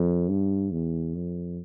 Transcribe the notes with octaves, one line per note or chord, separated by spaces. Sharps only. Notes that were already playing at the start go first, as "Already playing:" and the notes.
Already playing: F2
G2
E2
F2